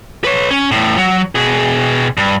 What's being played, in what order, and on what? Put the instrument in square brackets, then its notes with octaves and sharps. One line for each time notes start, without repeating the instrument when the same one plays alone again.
[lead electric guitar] B4 C#5
C#4
E2 A2
F#3
B2 G#4
G2